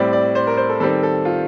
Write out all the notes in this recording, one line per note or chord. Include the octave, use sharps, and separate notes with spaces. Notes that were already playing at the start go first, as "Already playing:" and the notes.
Already playing: A2 G3 C4 D5
D5
C5
A#4
C5
A4
D#3 G3 C4 A4
A4
F4